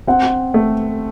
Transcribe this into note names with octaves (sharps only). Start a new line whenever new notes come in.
C4 F#5
A3